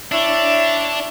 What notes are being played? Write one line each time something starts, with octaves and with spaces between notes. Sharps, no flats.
D4 E4 C#5 E5